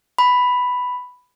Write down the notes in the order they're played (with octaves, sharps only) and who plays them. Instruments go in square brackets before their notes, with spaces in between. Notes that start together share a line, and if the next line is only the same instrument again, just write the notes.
[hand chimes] B5